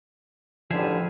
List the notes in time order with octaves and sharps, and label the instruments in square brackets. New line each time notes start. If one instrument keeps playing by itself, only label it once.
[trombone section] A1 D3 G3 [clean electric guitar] F3 G#4 E5